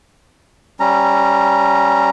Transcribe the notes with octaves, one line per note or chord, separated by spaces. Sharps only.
G3 C#4 A#5